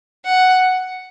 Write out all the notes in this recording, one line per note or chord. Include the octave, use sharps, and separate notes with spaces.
F#5